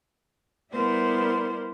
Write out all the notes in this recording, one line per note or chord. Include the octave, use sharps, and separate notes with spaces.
G3 B3 E4 A#4 C5 D5